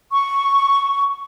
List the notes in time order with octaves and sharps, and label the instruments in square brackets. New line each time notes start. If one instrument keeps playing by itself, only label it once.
[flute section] C#6